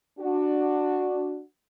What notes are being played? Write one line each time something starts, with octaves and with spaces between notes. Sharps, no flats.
D4 F#4